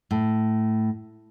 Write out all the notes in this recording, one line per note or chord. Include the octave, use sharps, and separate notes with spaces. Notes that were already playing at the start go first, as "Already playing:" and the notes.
A2